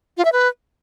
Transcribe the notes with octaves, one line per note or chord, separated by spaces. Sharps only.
F4
E5
B4